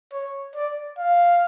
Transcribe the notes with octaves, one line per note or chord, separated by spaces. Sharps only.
C#5
D5
F5